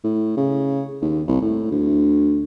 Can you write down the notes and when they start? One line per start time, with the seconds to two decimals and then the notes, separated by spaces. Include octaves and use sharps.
0.04 A2
0.37 C#3
1.02 D#2
1.28 C2
1.42 A2
1.71 D2